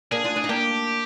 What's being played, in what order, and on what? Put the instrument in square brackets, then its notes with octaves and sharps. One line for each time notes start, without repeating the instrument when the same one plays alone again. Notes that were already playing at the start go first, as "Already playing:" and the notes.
[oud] A#3 D4 [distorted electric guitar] G#4
[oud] D4 F4
D4 F4
D#4
[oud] A#3 D4 [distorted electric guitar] G4